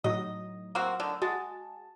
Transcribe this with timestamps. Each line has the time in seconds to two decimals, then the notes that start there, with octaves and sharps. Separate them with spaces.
0.04 A2 F#3 D#4 D#5
0.75 A#3 C4 F#4
1.00 D3 D#3
1.22 G#3 F#4 A5